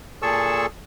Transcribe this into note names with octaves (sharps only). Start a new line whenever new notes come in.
A#2 G#4 A4 A5 C#6 E6